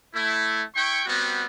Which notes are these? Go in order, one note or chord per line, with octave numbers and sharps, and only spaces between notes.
A3 E4
E4 G5 C#6
G3 B3 C4 F#4